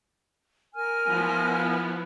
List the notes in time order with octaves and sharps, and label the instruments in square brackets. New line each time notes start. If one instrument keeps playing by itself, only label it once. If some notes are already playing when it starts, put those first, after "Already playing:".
[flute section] A#4 G#5 F6
[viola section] F3 B3 E4